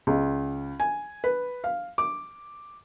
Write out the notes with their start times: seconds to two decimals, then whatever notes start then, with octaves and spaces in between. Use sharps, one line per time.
0.07 C#2
0.80 G#5
1.24 B4
1.64 F5
1.98 D6